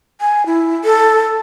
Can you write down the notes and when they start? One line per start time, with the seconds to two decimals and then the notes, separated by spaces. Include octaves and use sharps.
0.21 G#5
0.46 E4
0.84 A4